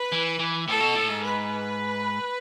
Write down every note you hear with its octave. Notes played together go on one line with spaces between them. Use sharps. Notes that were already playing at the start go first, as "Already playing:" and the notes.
Already playing: B4
E3
E3
A2 A4
B2
A2
G#2
B4